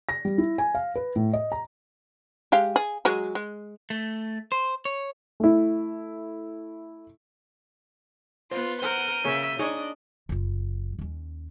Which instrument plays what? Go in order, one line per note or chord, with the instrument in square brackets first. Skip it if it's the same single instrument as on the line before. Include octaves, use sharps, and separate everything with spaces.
[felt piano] A#6
G3
E4
G#5
F5
B4
A2
D#5
A#5
[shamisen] G#3 G4 F5
G#4
F#3 G#3 G#4
G#3
[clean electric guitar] A3
C5
C#5
[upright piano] A3 E4
[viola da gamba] B3 [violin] F4 [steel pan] C5
[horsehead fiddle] A#4 F#5 [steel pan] C5 [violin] G6 D#7
[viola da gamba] C#3 [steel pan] A#3 G#4 C#5 [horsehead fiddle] E5
[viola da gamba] D4 [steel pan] D#4 G#4 C#5 [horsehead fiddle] D#5
[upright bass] F#1 F4
D#2 C#4